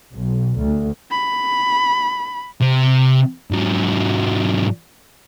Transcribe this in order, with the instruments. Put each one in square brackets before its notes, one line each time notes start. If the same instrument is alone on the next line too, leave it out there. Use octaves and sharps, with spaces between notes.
[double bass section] B1
D2
[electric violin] B5
[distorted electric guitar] C3
G#2 F#3